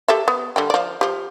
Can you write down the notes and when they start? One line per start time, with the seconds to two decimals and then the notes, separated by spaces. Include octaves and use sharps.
0.08 G4 A4 E5
0.28 B3
0.56 D3 G3 G5
0.70 F3 D5
1.01 F3 G4